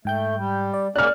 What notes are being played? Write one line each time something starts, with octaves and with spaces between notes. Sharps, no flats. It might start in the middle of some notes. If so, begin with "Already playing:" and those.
G#2 A3 G5 G6
G3
D5
C#3 A#3 C#4 D5 F6 F#6